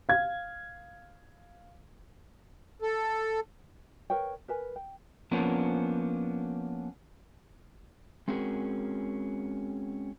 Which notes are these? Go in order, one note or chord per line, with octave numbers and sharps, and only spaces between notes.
F5 G#6
A4
A#4 B4 C#5 G5
A#4 B4 G#5
G5
F3 A#3 B3 C#4 D4
G#3 C4 C#4 F#4 G#4 A#4